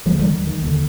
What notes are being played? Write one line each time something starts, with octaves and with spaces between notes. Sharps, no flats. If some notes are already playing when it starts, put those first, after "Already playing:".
D#2 D3 F3 G#3
D#3 G3
D#3
D#2 D3